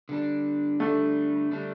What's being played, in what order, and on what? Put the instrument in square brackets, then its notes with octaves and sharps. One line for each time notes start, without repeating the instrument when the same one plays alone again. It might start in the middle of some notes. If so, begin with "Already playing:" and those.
[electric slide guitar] D3 G3 D4
[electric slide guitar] D3 G3 D4 [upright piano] A3
[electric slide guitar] D3 G3 D4